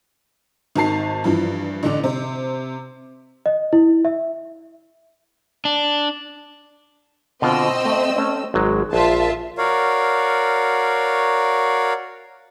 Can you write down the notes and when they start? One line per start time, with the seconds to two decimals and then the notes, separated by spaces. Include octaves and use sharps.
0.76 G#1 D#3 F#4 A5 C7
1.24 G2 E3 F3
1.83 A1 D3 D4
2.04 C3 C5
3.46 D#5
3.73 E4
4.05 E5
5.65 D4
7.42 B2 D3 C4 F4 D#5 E6
7.85 A3 E5
8.16 A3 C#4
8.54 G#1 F#3 G#3
8.93 A#1 F4 E5 A5
9.58 F#4 A#4 C#5 D5 F5